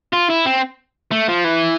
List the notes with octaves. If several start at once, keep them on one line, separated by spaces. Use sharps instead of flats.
F4
E4
C4
A3
F3
E3